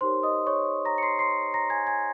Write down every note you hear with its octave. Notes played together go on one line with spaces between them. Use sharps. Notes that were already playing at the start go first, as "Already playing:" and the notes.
D#4 G4 A#4 C5 C#5 C6
D#5 D#6
C#5 C#6
A#5 A#6
C#7
C6 C7
C6 C7
A#5 A#6
G#5 G#6
G#5 G#6